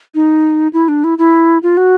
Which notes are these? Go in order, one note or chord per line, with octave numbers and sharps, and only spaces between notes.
D#4
E4
D4
E4
E4
F4
F#4